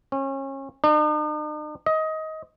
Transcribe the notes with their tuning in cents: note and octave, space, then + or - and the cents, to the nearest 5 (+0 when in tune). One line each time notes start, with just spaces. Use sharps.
C#4 -30
D#4 -45
D#5 +20